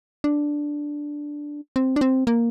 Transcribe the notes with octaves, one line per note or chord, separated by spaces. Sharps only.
D4
C4
D4
C4
A#3